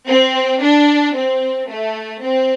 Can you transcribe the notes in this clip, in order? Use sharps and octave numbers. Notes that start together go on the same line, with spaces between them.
C4
D4
C4
A3
C4